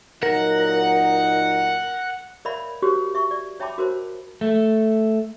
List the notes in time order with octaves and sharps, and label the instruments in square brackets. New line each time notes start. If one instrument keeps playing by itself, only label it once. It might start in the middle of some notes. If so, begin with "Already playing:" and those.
[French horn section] A#2 F#3 D#4 [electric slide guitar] A#4 [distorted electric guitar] F#5
[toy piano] A#4 C#5 D5 E5 F5 B5
F#4 G4 A#4 C5 C#5
E5 C#6
D5
C#5 E5 G5 A5 B5 D6
F#4 A#4 C5 C#5
[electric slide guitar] A3